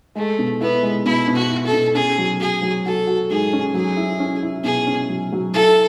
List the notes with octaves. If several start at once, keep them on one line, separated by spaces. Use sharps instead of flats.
G#3 A3
B2
B3 E4
G#3
B2 E4
B2
F#4
E4
A4
B2
C#4 G#4
F#3
F#4 G#4
F#3
F#4 A4
F#4
G#2 G#4
C#4
F#3 G#4
E4
C#4
E4
B2 G#4
C#4
F#3
F#3
E4 A4